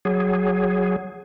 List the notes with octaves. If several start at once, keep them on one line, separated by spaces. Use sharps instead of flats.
F#3 G#4